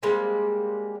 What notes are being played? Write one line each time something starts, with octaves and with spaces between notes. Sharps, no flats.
G3 G#3 A#3 C4